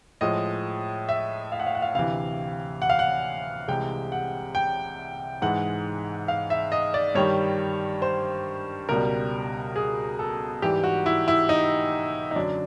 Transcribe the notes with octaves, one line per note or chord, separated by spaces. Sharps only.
A2 F3 G#3 D#5
E5
F5
F#5
F5
F#5
F5
D2 C3 E3 F5
F#5
F5
F#5
C2 C3 E3 G#3 G5
F#5
G5
G#2 E3 G#3 F#5
F5
E5
D#5
D5
G2 D#3 G3 C#5
C5
C#2 B2 G3 A#4
G#4
A4
G#2 E3 G3 G4
F#4
E4
E4
D#4
D#4
F#2 D3 F#3 D4